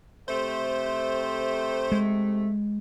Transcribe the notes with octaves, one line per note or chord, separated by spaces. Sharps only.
C3 A3 C5
G#3